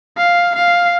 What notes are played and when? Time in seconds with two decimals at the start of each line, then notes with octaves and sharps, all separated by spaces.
0.18 F5
0.55 F5